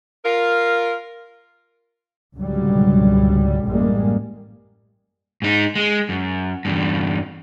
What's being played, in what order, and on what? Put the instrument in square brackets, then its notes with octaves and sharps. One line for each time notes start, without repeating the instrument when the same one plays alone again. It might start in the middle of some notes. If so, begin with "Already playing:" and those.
[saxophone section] F4 A#4
[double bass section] C#2 G#2 B2 D3 F#3 G3
A1 F#2 G3 G#3 A#3
[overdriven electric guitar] G#2 D#4
G#3
F#2
E2 G2